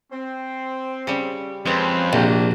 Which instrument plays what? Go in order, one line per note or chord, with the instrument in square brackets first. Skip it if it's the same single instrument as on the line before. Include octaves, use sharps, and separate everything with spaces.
[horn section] C4
[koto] C#3 G3
[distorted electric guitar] F2 [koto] G#3 C4 [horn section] C#4 B4 C5
[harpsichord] A#1 [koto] C3 [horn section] A#3 D4 F#4